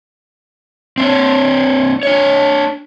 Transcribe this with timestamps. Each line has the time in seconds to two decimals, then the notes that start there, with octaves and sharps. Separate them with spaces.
0.98 C4 D4 C#5
2.03 D4 C#5